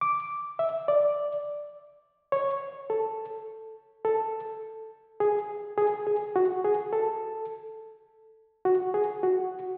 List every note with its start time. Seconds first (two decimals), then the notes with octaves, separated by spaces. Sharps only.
0.01 D6
0.59 E5
0.88 D5
2.32 C#5
2.90 A4
4.05 A4
5.20 G#4
5.78 G#4
6.07 G#4
6.36 F#4
6.65 G#4
6.93 A4
8.65 F#4
8.94 G#4
9.23 F#4